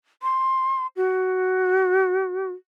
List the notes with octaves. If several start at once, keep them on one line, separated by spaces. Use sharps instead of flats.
C6
F#4